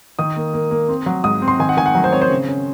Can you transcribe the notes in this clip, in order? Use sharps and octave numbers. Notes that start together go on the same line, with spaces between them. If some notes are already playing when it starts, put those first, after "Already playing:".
D#3 D#6
A#3
A#3
A#3
C4
F#3
G#2 D#6
C4
C6
D#3 G#5
F#5
D#3 G#5
F#5
F#3
C5
C4 C#5
C5
C#3
C#4